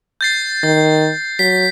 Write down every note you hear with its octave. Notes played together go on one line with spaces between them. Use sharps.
G6 A6 C7
D#3 A6
F#3 B6